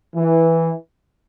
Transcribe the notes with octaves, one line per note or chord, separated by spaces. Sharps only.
E3